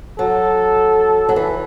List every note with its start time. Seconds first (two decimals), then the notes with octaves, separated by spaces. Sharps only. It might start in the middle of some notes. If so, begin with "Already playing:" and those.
0.19 F#3 A4
1.29 F#3
1.36 E3